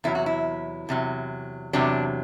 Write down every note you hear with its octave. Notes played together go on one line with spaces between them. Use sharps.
E2 C3 F#3 E4
F#4
E4
E2 C3 F#3
E2 C3 F#3 D4